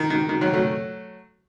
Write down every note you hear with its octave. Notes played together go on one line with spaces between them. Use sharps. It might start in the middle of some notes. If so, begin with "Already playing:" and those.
Already playing: D#3
D#3
D#3
D#3 F#3
F#3 A3